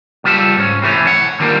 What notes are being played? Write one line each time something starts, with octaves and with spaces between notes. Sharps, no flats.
C#2 G3 F4 G4 A4
G#2 C#4
C3 E3 A3 C#4
A2 C#5 F#5
D3 D#3 F3 G3 A3 A#3